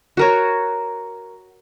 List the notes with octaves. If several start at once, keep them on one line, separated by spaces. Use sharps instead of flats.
F#4 A#4 C#5